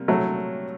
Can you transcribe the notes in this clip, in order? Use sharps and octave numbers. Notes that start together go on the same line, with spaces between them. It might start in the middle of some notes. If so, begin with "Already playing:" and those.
Already playing: C3 G3 A#3
F#3 A3